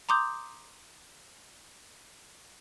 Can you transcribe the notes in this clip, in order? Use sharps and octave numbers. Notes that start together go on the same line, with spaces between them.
A#5 C6 D6 D#6 G6